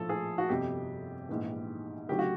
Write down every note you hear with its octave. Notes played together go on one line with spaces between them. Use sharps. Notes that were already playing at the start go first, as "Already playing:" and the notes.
Already playing: A#1 A2 F3 A4
G#4
F#4
G1 F2 C3 G4
A#1 G#2 E3
D2 C#3 F#3 G4
F#4